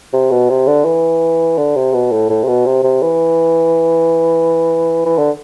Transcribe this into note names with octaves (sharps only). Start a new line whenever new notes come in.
C3
B2
C3
D3
E3
D3
C3
B2
A2
A2
C3
B2
C3
C3
E3
E3
D3